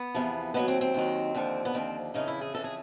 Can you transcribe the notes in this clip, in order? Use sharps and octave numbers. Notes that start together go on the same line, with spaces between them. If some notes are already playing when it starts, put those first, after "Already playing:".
Already playing: B3
E2 C3 F3
D#2 D#3 F#3 B3
C4
C4
D#2 D#3 F#3
D#2 D3 F3
B3
D#2 D3 F3 C4
F2 C#3 E3 D#4
E4
G#4
F2 C#3 E3 A4
G#4